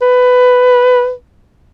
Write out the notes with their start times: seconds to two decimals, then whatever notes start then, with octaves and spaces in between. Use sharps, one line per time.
0.02 B4